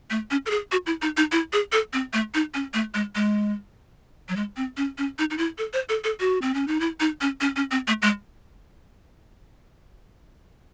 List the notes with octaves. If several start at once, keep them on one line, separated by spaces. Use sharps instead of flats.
A3
C#4
A4
G#4
F#4
E4
D#4
D#4
E4
G#4
A4
C4
A3
D#4
C#4
A3
G#3
G#3
F#3
G#3
C4
C#4
C#4
D#4
D#4
E4
A4
C5
A4
A4
F#4
C4
C#4
D#4
E4
D#4
C#4
C#4
C#4
C4
A3
G#3